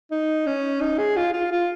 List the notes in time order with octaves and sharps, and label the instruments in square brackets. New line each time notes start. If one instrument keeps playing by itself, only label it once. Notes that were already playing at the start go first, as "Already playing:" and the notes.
[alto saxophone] D#4
C#4
D#4
G#4
F4
F4
F4